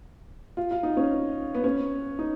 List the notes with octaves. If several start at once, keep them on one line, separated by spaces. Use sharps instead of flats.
F4
F4
D#4
C#4
B3
C#4
D#4